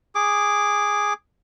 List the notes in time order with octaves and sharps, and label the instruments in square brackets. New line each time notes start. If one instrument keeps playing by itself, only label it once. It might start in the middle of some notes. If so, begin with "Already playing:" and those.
[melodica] G#4 D6